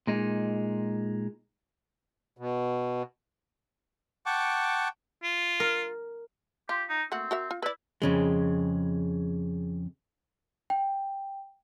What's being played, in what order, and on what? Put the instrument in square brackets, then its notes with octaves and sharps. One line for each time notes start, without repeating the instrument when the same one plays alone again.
[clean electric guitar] A#2 G#3 D#4
[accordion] B2
[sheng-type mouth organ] F#5 G5 A5 C#6 D6
[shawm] F4
[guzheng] A#4
[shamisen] F4 [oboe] G4
[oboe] D#4
[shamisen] A3 A#3 F#4 [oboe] C4
[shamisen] F#4 A#4 E5
F4
[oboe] E4 [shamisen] B4 D5
[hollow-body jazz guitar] F2 C#3 G#3
[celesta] G5